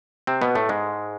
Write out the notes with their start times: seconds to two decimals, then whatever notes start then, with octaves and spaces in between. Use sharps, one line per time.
0.27 C3 C4
0.42 B2 B3
0.55 A2 A3
0.69 G#2 G#3